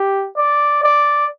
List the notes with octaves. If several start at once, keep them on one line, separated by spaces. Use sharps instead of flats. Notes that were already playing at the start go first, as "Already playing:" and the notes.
Already playing: G4
D5
D5